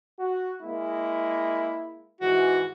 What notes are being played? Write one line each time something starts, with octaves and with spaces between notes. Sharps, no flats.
F#4
G#3 A#3 E4
G#2 E3 F#4